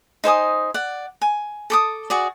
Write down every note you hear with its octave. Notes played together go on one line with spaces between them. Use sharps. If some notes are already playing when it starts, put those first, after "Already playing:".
D#4 C5 G#5 D#6
D5 F#5
G#5
A4 D6 D#6
F#4 G#4 D5